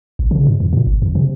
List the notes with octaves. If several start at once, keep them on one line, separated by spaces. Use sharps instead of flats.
A1
C#3
G#2
F2
A#2
G1
F2
C3